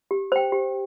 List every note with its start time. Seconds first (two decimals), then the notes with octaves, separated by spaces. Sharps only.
0.11 G4
0.32 C5 G5
0.52 G4